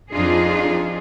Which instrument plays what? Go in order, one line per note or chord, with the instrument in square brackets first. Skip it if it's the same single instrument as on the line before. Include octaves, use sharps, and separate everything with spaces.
[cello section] F2 D4 D#4 F4 G#4